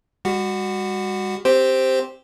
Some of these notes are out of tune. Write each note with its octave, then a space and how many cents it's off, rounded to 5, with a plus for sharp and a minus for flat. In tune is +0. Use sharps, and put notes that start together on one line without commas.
G3 +40 F#4 +0
C4 +0 G4 +0 C5 +0